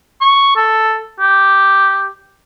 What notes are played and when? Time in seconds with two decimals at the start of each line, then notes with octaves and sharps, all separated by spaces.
0.21 C#6
0.56 A4
1.20 G4